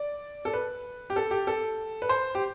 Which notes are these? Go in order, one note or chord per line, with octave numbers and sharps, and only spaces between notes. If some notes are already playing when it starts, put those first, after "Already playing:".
Already playing: D5
A4
B4
G4
A4
G4
A4
B4
C5
G4